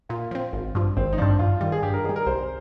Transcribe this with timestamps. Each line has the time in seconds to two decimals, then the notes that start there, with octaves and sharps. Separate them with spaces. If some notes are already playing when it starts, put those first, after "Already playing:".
0.09 A#2 F4
0.31 F3 C4
0.53 G#1
0.75 G2 F3
0.97 G#1 C4
1.13 D#4
1.18 G2 F3 D4
1.39 G2 F4
1.61 D#3 G3
1.72 G#4
1.82 G2 G4
1.93 A#4
2.04 D#3 G#4
2.09 G3
2.16 A#4
2.26 C2 C5